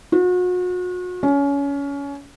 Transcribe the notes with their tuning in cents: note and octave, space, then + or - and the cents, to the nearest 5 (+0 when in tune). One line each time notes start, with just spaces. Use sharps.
F#4 -40
C#4 +25